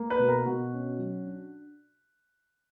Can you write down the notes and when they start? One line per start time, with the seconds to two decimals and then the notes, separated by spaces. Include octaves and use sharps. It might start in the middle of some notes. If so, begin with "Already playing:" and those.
Already playing: A#3
0.10 B4
0.19 B2
0.29 A#4
0.46 B2 F#4
0.73 C#4
0.99 F#3
1.25 D4